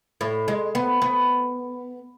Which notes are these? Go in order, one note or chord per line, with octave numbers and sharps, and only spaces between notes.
A2
G#3
B3
B3